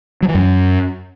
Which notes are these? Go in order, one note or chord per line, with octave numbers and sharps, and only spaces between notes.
F#3
E3
F#2